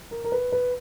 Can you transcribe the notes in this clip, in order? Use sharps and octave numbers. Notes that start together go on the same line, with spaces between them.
A#4
A#4
B4
B4